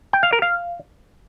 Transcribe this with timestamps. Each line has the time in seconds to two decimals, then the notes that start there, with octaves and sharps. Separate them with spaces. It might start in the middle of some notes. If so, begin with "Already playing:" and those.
0.13 G5
0.23 F5
0.33 A#4
0.42 F5